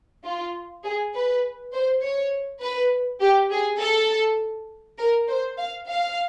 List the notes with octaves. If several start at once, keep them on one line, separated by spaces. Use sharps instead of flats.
F4
G#4
B4
C5
C#5
B4
G4
G#4
A4
A#4
C5
F5
F5